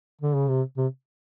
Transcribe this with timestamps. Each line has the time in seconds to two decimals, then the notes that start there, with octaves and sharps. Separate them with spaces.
0.21 D3
0.35 C#3
0.49 C3
0.77 C3